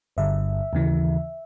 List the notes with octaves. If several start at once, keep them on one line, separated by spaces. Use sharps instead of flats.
G1 G2 D3 E5
D#2 C#3 E3